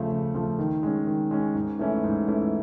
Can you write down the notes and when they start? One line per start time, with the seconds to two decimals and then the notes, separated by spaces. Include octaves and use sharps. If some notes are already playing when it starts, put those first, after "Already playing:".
Already playing: C#3 F3 A3
0.11 C#3
0.34 F3 A3
0.59 D#3
0.83 G#3 C#4
1.07 D#3
1.31 G#3 C#4
1.55 G#2
1.79 E3 A3 C#4 E4
2.04 G#2
2.28 E3 A3 C#4 E4